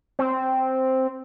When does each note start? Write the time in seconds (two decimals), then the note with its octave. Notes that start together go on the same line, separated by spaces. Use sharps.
0.19 C4